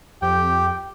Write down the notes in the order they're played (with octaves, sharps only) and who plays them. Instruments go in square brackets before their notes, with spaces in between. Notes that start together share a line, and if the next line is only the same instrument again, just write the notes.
[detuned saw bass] F2 [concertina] G4 [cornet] G5